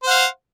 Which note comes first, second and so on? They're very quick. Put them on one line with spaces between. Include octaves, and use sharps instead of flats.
C5 F#5 F5